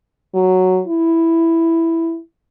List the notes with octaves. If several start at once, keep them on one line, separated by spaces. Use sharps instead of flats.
F#3
E4